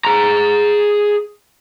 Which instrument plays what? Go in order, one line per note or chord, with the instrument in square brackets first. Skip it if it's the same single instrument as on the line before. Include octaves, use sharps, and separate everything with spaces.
[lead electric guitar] G#4 A#5